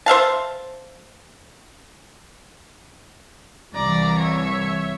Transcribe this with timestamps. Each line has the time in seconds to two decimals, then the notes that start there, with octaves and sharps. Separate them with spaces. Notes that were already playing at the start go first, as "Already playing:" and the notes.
0.06 C5 E5 F5 A5
3.75 C2 E3 D5 A#5
4.19 C#5 E5